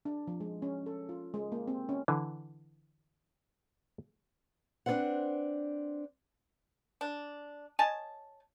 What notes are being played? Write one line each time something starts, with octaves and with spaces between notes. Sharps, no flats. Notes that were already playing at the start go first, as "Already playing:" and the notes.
D4
F3
G#3
C#4
A4
F4
G#3
A#3
C4
C#4
D3 E3
C4 D4 F4 B4 C5 F#5
D4
C#5 D#5 G#5 A5